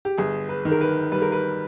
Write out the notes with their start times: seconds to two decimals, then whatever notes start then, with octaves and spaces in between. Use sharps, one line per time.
0.05 G4
0.17 G1 G#4
0.49 B4
0.65 D#3
0.72 A#4
0.81 B4
1.12 G3 B4
1.22 A#4
1.32 B4